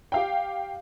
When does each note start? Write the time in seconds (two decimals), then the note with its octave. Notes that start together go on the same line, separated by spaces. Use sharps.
0.12 G4 F5 G5